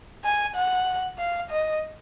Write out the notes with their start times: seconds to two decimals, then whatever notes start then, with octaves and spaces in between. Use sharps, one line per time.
0.24 G#5
0.56 F#5
1.18 F5
1.50 D#5